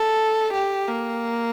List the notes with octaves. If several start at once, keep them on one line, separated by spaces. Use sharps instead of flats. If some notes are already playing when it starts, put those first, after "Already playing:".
Already playing: A4
G4
A#3